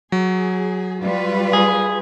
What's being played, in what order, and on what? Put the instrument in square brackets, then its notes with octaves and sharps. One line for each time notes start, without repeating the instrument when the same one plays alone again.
[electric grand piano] F#3 [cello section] G#4
[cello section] G3 F4 B4
[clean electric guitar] G#4